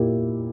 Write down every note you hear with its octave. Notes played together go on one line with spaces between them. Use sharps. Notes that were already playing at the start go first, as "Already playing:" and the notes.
Already playing: A#2 E4 G4